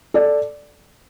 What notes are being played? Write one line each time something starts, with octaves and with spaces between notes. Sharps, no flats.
A4 D5